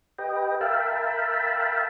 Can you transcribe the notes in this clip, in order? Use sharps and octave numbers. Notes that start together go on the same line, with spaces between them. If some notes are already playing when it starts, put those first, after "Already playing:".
G4 B4 D#5 G5
A#4 E5 F5 G5 A5 B5